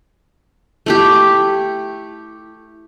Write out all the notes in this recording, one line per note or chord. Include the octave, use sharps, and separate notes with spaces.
A3 E4 G4